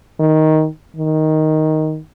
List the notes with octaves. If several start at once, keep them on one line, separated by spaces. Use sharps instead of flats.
D#3
D#3